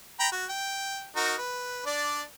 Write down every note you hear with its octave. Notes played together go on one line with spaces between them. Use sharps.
G5 A#5 B5
F#4
G5
D#4 F#4 A#4
B4
D4 D5